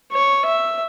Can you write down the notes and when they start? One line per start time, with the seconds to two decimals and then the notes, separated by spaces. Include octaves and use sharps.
0.12 C#5
0.46 E5